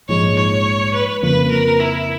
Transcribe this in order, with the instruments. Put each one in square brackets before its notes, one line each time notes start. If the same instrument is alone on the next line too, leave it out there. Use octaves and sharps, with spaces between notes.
[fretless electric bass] A#1 G#2 F3 G#3 [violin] C#5
[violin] C#5
B4
[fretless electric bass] F2 C#3 F3 A#3 [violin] B4
[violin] A#4
E4